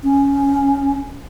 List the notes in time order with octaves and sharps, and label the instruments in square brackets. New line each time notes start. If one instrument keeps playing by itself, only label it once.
[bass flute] C#4